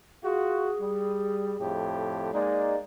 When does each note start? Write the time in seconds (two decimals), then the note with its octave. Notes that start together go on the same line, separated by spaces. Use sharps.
0.23 F4 F#4 G#4
0.79 G3
1.59 F2 A2 G4
2.34 G#3 A#3 D#4 D5